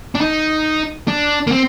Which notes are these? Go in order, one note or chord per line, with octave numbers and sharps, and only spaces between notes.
D4
D#4
D4
A#3
C4